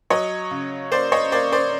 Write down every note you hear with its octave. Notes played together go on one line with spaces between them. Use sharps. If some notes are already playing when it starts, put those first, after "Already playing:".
F#3 C#5 D#5
C#3
A#3 C5 D5
C#5 D#5
A#3 C5 D5
C5 D5